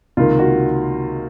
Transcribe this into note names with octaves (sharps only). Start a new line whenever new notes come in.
C#2 C3 D#3 A#3 F4
F#4